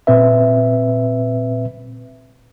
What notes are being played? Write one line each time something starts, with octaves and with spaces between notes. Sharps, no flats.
A#2 C4 B4 E5